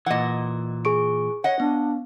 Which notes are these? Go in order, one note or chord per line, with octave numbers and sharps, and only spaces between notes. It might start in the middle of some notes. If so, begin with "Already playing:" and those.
A#2 E3 D#5 F#5
G#4 C#6 D7
C#5 D#5 F#5
B3 D4